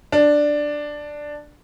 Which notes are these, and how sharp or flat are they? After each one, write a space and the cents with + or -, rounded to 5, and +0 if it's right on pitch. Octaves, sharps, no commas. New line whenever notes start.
D4 +5